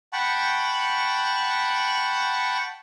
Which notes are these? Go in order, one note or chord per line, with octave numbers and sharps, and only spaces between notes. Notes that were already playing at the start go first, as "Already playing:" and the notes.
F#5 G5 A5 B5 C#6